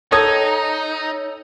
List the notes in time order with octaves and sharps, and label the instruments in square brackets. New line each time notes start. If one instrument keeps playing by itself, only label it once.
[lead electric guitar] D#4 [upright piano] A4 D#6 G#6 [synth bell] C#5